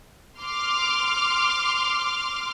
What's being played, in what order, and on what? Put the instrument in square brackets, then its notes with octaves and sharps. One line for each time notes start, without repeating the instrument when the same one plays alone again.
[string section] C6 D6 F6